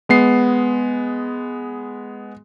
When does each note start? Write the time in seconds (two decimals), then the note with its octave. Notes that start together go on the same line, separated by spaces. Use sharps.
0.09 G#3 B3 C7